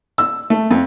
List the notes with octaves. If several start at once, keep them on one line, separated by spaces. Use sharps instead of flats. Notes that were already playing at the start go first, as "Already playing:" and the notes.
E6
A3
F2